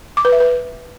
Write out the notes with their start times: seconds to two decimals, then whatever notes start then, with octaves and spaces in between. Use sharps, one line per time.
0.17 D6
0.25 B4
0.32 E5
0.40 B4